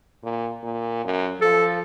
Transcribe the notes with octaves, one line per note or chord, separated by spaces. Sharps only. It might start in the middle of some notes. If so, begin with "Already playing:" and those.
A#2
A#2
F#2
F3 A4